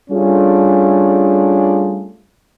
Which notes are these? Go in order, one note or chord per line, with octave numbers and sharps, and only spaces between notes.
G3 A3 C#4 D4 F4 G#4